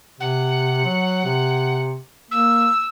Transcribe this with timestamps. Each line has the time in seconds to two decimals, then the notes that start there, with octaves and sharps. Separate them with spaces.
0.20 C3 F#5
0.84 F#3
1.25 C3
2.31 A#3 E6